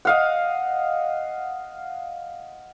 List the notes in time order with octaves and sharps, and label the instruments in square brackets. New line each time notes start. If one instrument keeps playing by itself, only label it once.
[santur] D#5 F5 F#5